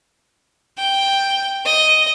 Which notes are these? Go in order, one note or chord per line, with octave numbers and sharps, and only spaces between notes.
G5
D#5